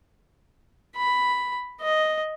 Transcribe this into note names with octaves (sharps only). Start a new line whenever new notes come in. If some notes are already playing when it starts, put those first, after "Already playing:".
B5
D#5